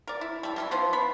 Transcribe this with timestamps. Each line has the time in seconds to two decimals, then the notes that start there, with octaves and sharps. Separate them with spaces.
0.07 A#4 D5
0.21 E4
0.43 G3 A4
0.56 F#3 G3 E4
0.71 F3 B3 D#4 C5
0.93 B3 B5